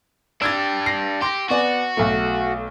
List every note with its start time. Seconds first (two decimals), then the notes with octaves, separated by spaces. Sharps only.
0.42 D4 G4 E6 G#6 A6
0.86 A#6 C7
1.22 G4 C6 A#6
1.50 B3 F#4 D5 G#5
1.97 B1 A3